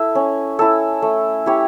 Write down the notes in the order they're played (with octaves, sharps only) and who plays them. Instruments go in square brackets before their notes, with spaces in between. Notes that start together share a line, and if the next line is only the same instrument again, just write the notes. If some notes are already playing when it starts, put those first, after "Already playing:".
Already playing: [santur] E4 A4 E5
C#4
E4 A4
A3
E4 G4 C#5